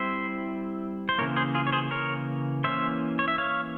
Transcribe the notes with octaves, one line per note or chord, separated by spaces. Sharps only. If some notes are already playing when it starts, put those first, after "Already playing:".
Already playing: G3 C4 E4 C5 E5
C5
C#3 E3 A#3 A#4 C#5
G#4 C5
F4 G#4
C#5
G#4 C5
A#4 C#5
E3 A#3 C#4 C5 E5
C#5
E5
C#5 F5